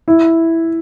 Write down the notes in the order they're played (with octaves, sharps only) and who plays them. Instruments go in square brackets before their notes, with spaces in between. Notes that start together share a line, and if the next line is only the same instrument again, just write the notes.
[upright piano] E4